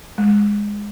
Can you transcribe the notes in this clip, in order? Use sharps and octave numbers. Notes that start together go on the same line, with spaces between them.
G#3